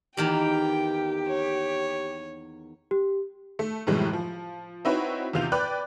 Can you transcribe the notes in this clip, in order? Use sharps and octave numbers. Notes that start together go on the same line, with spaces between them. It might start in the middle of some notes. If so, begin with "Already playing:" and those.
E2 D#3 A#3 G4 G5
C#5
G4
A3
F#2 A2 C3 E3 G3 G#3
F3
C4 D#4 E4 F#4 B4 C#5
E2 C3 F4 G6 F7
B4 D5 G5 B5 D6 F#6